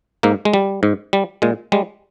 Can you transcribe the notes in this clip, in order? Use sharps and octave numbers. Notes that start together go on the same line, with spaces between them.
G#2 A#3
G#3
G3
G#2
G3
A#2 G#3
G3 G#3